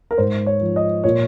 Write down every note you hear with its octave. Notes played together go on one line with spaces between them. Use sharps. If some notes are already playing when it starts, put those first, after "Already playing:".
A#4
G#2 C5
C#5
F3
D#5
A#2 C#5